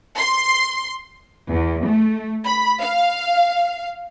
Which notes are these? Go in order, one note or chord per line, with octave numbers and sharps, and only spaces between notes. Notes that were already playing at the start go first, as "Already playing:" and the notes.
C6
E2
A3
B5
F5